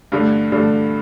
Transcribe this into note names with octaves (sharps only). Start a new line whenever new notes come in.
G2 D3 A3
G2 D3 A3